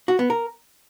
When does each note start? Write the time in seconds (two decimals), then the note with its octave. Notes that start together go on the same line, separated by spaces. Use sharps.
0.08 F#4
0.19 B3
0.30 A#4